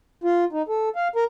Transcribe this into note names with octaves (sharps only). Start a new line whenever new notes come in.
F4
D#4
A4
F5
A#4